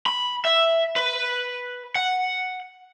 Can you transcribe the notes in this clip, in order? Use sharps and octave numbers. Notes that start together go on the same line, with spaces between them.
B5
E5
B4
F#5